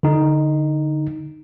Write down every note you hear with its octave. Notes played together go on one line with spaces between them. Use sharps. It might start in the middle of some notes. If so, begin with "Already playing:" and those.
D3 D#4